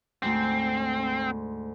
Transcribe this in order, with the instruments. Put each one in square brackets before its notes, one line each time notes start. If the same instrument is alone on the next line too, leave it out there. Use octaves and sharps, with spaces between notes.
[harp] D2 G#2 [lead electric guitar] C4